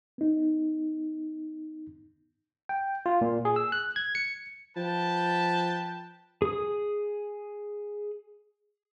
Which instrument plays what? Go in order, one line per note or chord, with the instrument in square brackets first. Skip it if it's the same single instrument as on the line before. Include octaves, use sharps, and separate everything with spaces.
[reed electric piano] B3 D#4
[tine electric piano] G5
F4
A#2
G#4
E6
F#6
G#6
C#7
[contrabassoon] F3 [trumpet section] B4 G5 A5
[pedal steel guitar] G#4 D#6